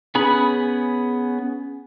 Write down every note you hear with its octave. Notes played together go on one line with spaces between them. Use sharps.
B3 C#4 G#4 B5